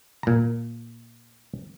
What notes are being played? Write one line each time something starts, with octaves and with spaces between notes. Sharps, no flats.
A#2 A#5